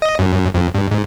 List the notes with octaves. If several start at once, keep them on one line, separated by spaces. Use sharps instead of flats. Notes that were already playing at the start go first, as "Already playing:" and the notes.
D#5
F#2
F2
G2
G#2